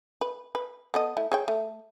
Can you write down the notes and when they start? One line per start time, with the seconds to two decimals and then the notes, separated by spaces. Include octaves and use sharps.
0.21 B4
0.55 B4
0.94 B3 A4 D#5
1.17 A3 E4
1.32 G#4 C#5 G5
1.48 A3